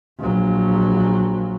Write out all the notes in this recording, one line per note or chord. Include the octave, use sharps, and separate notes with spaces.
A#1 F#3